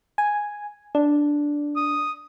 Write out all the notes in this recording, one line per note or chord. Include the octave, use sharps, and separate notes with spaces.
G#5
D4
D#6